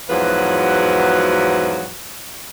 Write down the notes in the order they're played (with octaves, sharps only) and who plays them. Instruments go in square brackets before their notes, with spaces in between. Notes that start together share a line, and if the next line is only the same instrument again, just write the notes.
[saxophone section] E2 G#2 F3 F#3 F#4 B4